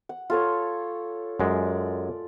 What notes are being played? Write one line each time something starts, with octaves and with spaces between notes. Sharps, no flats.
F#5
F4 A4 C#5
F#2 G#3 D5